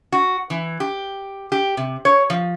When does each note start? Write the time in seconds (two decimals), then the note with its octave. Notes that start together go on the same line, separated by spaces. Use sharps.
0.12 F#4
0.50 E3
0.80 G4
1.52 G4
1.77 C3
2.05 C#5
2.30 F3